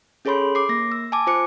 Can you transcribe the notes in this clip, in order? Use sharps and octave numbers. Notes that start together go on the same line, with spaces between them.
C#4 G#4 A4 C#5 B5 C6
D6 C7
A#3 A#6
E6
G#5 A5 D6
F4 C5 D6 C#7